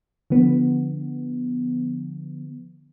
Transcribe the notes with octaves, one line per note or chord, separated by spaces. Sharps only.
D3 F3 B3